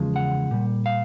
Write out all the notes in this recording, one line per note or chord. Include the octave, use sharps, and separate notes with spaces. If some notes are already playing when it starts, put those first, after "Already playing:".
Already playing: E2 C#3 F3 G#3
F#5
A#2 G3
F5